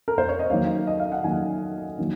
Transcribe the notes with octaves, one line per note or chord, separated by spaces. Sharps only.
A#4
C5
C#5
D#5
D#3 F#3 A#3 F5
D#5
F5
F#5
D#3 F#3 A#3 G#5
D#3 F#3 A#3